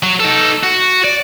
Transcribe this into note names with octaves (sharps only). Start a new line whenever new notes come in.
F#3
D#4 A4
F#4
D5